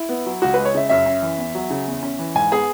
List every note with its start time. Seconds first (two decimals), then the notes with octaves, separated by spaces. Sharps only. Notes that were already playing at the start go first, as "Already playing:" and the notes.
Already playing: E4
0.09 B3
0.26 F#3
0.42 C#2 F#4
0.54 G#3 B4
0.65 C#5
0.74 C#3 E5
0.89 F#2 E5
1.06 C#4
1.22 E3
1.38 E2
1.55 F#3
1.70 C#3
1.87 E2
2.03 C#4
2.19 E3
2.35 G#2 G#5
2.52 B3 G#4